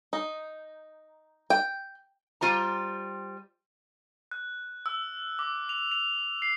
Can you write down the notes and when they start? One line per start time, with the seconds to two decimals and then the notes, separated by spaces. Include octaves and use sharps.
0.13 D#4
1.50 G5
2.41 G3 F4 C5 A#5
4.31 F#6
4.86 E6
5.39 D6
5.69 F7
5.92 F7
6.42 C7